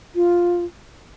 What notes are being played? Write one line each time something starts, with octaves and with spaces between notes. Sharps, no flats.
F4